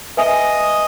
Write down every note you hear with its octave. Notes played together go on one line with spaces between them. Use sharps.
B4 D#5 E5 G#5